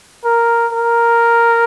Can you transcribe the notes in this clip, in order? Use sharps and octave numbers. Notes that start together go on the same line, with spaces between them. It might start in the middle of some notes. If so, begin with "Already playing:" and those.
A#4
A#4